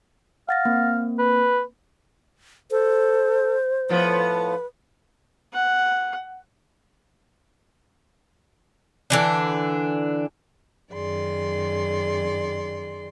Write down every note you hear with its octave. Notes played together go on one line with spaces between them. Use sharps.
F5 F#5 A6 A#6
A#3 C4
B4
A4 C5
A2 F3 B3 B4
F#5
D3 E3 D4
F#2 D#3 G#4 D5 C6